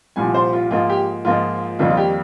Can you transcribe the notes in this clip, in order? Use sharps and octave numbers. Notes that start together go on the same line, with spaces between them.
C2 A#2 F3 G#5
C5
F4
G#2 F3 A#3 D#4 F4
G4
G#2 F3 A#3 D#4 F4
F2 D#3 G3 A#3 D#4 F4
F4
G4